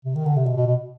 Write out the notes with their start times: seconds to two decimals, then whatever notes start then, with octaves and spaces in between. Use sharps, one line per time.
0.05 C3
0.15 D#3
0.26 D3
0.36 C3
0.46 B2
0.57 B2
0.67 B2